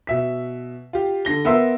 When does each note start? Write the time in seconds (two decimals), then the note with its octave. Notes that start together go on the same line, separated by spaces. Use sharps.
0.07 B2 E5 B6
0.93 F4 G4
1.25 D3 A#6 G7
1.45 B3 A#4 E5 C6 E6